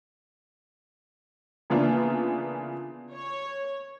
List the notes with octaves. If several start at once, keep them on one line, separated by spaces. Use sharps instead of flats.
C#3 E3 A#3 B3 D4 F4
C#5